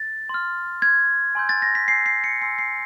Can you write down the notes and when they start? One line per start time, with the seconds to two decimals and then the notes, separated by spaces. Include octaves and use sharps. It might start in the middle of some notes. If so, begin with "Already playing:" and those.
Already playing: A6
0.29 C6 F6
0.82 F6 G#6
0.87 C6
1.35 G#5 C6 E6 G6
1.49 A6
1.62 A#6
1.75 B6
1.88 G#5 C6 E6 G6 C7
2.06 C7
2.24 C#7
2.41 G#5 C6 E6 C7
2.59 C7